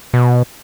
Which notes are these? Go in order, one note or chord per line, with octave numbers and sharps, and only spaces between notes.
B2